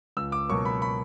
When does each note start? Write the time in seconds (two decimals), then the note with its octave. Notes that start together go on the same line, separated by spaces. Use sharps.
0.17 C#2 E6
0.32 D6
0.49 B2 F#3 A#3 C#6
0.65 B5
0.82 B5